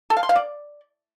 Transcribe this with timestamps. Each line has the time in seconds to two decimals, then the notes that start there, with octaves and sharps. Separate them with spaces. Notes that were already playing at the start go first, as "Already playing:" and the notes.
0.10 A4
0.17 F5
0.23 C6
0.29 F5
0.36 D5